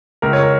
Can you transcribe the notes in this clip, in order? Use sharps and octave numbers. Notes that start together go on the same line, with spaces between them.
C#2 A#4
C#5
A#4